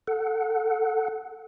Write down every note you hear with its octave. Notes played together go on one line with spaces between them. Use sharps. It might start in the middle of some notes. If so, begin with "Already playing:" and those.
A4 F#5